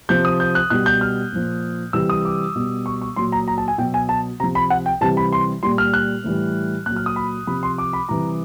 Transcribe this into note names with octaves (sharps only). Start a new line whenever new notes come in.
C3 F3 G6
D#6
G6
F#6
B2 G3 F#6
G6
F6
A#2 F3
C3 E3 G3 E6
D#6
D6
B2 G3
C#6
C#6
A#2 F#3 C6
A#5
A#5
A5
G#5
B2 F#3 G5
G#5
A5
C3 F3 A#5
B5
F#5
G5
C3 E3 G3 A5
B5
C6
A#2 G3 C6
F6
F#6
A2 E3 G3
A#2 F#3 F#6
F6
D#6
B5
C3 F3 B5
C6
D6
B5
C3 E3 G3 A#5